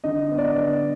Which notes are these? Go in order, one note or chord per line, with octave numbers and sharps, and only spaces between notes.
D3 D#5
B3
D5
D#5
D3